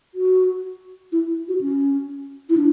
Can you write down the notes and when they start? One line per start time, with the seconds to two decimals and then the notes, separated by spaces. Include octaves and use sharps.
0.15 F#4
1.12 E4
1.48 F#4
1.61 C#4
2.50 E4
2.57 D4